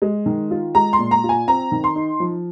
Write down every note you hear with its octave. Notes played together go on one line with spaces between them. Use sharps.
G#3
D#3
F4
G#3 A#5
C6
A#2
A#5
F4
G#5
C4 A#5
D#3
C6
D#4
F3